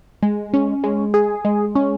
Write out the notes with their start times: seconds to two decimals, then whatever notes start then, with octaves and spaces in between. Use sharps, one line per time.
0.23 G#3
0.54 C#4
0.84 G#3
1.14 G#4
1.45 G#3
1.75 C#4